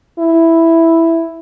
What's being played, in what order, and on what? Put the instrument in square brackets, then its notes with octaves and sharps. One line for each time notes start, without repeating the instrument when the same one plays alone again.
[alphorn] E4